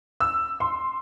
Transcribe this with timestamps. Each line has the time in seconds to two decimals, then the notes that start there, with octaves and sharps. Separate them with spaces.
0.20 E6
0.60 C6